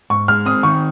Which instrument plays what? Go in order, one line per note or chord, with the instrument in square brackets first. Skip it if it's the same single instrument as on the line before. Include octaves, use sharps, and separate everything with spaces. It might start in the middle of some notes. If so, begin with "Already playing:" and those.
[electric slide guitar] G#2 [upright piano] C#6
[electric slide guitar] G#3 [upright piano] F6
[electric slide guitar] C4 [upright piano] D#6
[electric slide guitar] D#3 [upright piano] C#6